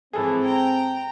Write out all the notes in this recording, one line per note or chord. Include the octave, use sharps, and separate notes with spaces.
G#2 E3 F3 C4 G#4 A4
G5 A#5